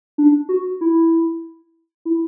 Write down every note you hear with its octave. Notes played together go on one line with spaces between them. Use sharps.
D4
F#4
E4
E4